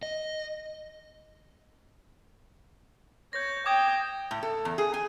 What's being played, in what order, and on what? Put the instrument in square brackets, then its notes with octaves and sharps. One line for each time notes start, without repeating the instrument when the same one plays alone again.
[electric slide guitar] D#5
[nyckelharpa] C#5 [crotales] G6 A#6
[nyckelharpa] G5 [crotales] D6 D#6 G#6
[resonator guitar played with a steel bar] A2
A4
E2
G#4
G#5